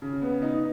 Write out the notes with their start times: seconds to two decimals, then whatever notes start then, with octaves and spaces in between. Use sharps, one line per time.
0.02 C#3
0.22 B3
0.42 D#4